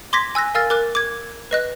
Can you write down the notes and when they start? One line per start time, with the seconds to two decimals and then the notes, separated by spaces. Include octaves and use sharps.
0.13 C6 D6 G#6 A#6 B6
0.35 G#5 E6 F#6 A#6
0.55 A#4 F5 G#5 E6 F6 A6
0.70 A#4 D6 F#6
0.95 D6 G#6
1.51 B4 D#5 F#6